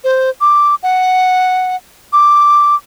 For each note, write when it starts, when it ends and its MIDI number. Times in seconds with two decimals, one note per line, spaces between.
0.04 0.30 72
0.41 0.75 86
0.83 1.76 78
2.13 2.75 86